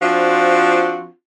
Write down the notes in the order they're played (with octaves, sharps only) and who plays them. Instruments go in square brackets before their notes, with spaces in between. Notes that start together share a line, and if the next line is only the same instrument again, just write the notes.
[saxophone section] F3 C4 D4 F4 F#4